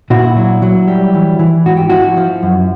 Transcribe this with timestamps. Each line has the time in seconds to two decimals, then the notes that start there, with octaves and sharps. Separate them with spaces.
0.10 A#2 E4 F#4
0.37 F#3
0.62 F#3
0.88 G3
1.14 E3
1.39 E3
1.66 G#2 F#4
1.77 G4
1.90 F3 E4 F#4
2.17 F3
2.43 F#2